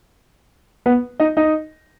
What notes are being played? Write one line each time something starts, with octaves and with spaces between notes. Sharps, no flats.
B3 B4
D#4 D#5
D#4 D#5